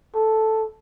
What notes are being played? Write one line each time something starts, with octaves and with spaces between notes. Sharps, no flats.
A4